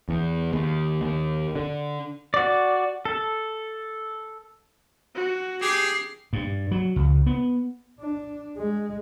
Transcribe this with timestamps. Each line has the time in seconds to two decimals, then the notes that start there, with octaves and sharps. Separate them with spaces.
0.09 E2
0.53 D#2
1.02 D#2
1.56 D3
2.34 F#4 D5
3.05 A4
5.15 F#4
5.62 G4 G#4 C7
6.33 G2
6.71 F#3
6.96 C#2
7.26 B3
7.99 D4
8.58 G#3